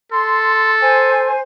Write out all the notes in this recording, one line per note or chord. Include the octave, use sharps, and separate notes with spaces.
A4 C6
C5 G#5